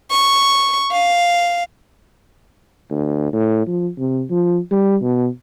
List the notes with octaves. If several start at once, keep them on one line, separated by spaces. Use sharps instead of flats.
C#6
F5
D2
A2
F3
C3
F3
G3
B2